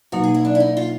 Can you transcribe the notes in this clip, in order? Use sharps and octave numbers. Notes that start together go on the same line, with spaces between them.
B2 F#3 A#3 D#4 F#4
G#4
E4
D4
E4
D#4
F4